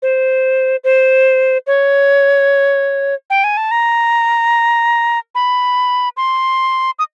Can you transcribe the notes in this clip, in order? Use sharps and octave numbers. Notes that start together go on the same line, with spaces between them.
C5
C5
C#5
G5
G#5
A5
A#5
B5
C6
D#6